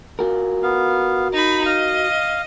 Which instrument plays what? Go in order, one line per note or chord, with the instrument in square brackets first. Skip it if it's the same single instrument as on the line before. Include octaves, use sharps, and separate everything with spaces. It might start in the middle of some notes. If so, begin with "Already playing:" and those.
[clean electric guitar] F4 F#4 A#4
[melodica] B3 F5
[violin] D#4 B5 [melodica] A#5
[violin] D#5 [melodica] F5